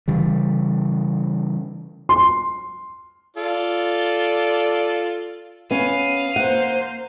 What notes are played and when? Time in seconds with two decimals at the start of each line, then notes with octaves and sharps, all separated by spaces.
0.08 C#3 E3 G3
2.09 C6
3.37 F4 A4 D5
5.71 B3 C#4 F5 D#7
6.36 A#3 C5 F#5